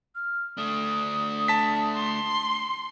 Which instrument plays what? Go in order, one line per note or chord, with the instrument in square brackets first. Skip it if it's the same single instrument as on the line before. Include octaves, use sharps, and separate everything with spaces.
[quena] F6
[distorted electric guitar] A3 D4 [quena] D#6
[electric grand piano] A5 B6
[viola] C6